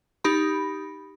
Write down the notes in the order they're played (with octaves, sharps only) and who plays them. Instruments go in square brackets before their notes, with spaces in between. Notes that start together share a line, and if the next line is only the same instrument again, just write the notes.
[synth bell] D#4 G4 B5